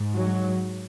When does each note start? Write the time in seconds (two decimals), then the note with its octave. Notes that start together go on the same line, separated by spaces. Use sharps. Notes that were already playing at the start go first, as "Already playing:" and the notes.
Already playing: G#2
0.13 F#3